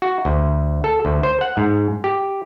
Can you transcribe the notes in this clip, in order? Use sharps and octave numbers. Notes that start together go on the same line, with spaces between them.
F#4
D2
A4
D2
C5
F#5
G#2
G4